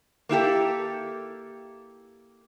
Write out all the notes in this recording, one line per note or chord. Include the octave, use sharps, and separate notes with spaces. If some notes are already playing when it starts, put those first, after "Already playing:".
A#3 E4 G4 A4